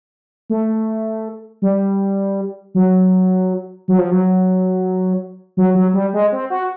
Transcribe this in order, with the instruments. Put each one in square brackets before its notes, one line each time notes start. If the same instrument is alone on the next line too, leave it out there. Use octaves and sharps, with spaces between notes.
[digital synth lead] A3
G3
F#3
F#3
F3
F#3
F#3
F#3
G3
G#3
C4
F#4